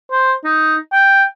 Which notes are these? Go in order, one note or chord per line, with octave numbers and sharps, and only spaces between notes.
C5
D#4
G5